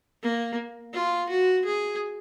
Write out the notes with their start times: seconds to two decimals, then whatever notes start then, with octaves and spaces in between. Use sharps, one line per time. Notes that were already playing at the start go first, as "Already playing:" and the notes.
0.23 A#3
0.94 F4
1.29 F#4
1.65 G#4